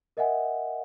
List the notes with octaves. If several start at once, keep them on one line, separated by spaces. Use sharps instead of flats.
A#4 D#5 E5 F#5 G#5